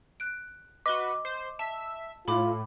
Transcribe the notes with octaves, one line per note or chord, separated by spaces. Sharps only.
F#6 D7
F#4 B4 D#5 D6 G7
C5
E5 A5
A2 F4 B5 D6